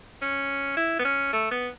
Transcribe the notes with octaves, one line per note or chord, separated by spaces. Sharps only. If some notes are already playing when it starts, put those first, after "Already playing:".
C#4
E4
B3
C#4
A3
B3